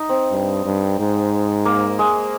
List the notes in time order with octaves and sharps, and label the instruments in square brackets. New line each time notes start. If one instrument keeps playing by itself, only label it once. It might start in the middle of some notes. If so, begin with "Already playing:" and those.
Already playing: [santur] D#4
C4
[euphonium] G2
G2
G#2
[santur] A#3
G#3